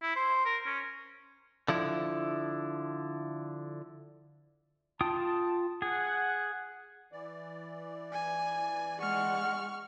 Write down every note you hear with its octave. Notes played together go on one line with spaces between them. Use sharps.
E4
C5
A#4
C#4
D3 F3 E4
F4 G5 A5 D#6
G#4 F#5
E3 D5
G#5
G#3 F#5 C#6 F6